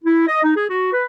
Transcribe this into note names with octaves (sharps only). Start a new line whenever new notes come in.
E4
D#5
D#4
G#4
F#4
B4